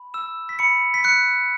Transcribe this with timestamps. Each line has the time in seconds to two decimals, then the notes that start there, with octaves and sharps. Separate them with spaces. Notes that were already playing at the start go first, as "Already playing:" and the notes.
Already playing: B5
0.14 E6 E7
0.49 B6
0.59 B5 C#7
0.94 B6
1.04 F#6 C#7